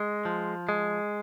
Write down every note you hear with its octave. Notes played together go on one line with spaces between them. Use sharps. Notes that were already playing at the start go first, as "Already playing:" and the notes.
Already playing: G#3
F3
G#3